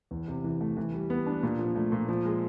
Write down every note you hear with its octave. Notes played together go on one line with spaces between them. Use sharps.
E2
C3
E3
A3
E3
G3
B3
D4
A#2
F3
A3
A#2
F3
G#3